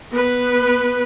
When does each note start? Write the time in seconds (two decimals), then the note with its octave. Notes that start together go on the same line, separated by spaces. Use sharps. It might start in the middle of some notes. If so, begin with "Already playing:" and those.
0.12 B3 B4